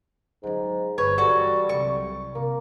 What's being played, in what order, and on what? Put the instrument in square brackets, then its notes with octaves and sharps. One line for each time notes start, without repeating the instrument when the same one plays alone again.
[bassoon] G#2 [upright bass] F#3 C#4
[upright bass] G1 [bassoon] B4 [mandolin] C#5
[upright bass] E3 [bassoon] G3 [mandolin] F#4 A4
[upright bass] C2 F#3 [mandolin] C#6
[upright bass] C3 [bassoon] A#3